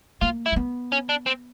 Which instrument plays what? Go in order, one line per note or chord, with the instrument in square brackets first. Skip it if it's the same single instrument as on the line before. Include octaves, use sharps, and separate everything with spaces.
[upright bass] A#3 [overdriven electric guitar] F4
[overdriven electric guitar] E4
[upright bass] C4
B3
[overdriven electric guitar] C#4
D4
C4